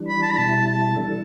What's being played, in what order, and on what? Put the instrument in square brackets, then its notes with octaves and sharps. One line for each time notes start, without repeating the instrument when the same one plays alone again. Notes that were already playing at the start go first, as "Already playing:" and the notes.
Already playing: [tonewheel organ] E3 G3 D4
[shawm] B5
A5
B5
[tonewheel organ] B2 G3 E4 [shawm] A5
[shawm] A5
[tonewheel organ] E3 G3 D4 A4